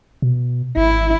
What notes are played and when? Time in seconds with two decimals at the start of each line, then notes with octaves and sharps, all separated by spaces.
0.22 B2
0.77 G#1 E4